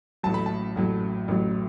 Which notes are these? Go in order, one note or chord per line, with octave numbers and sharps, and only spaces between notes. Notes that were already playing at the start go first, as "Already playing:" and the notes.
A1 A2 F#3 A5
B5
A5
A1 A2 F#3
A1 A2 F#3